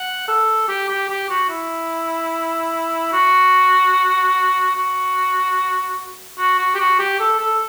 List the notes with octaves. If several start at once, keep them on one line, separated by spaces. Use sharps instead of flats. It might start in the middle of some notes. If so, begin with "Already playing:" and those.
Already playing: F#5
A4
G4
G4
G4
F#4
E4
F#4
F#4
F#4
F#4
G4
F#4
G4
A4
A4